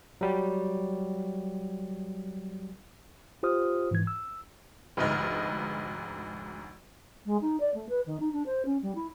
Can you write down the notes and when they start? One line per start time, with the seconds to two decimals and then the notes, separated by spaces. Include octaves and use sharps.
0.21 F#3 G3
3.43 F4 G4 C5 D#6 F6
3.91 G#2 E3 G#6
4.07 E6
4.97 F1 D2 G#2 B4 D#5 F6
7.26 G#3
7.41 D#4
7.60 D5
7.74 A3
7.89 B4
8.06 D#3
8.20 D#4
8.33 D4
8.46 C5
8.65 C#4
8.82 G3
8.95 E4